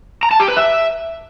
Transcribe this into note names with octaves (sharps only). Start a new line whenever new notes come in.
A#5
A5
G4
B4
E5